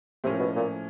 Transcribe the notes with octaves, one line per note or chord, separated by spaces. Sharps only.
A2 C3 F3 A#3 C#4
B2
A#2